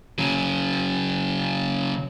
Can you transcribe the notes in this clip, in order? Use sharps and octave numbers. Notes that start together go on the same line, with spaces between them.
C#3 F#3